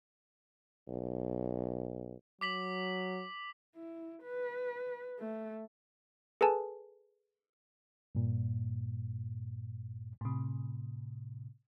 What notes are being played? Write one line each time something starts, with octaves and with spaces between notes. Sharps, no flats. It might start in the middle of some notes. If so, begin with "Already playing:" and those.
B1
F#3 D6 B6 F#7
E4
B4
A3
G#4 A4 B4 G#5 A5
G2 A#2
A2 C3